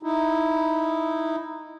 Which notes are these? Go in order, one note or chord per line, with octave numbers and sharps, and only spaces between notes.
D#4 E4